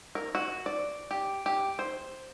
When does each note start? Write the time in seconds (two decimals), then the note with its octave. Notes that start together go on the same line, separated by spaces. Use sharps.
0.15 A#4
0.35 F#4
0.66 D5
1.11 G4
1.46 G4
1.79 C5